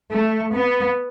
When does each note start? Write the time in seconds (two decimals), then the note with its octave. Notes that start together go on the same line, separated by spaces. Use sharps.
0.11 A3
0.53 B3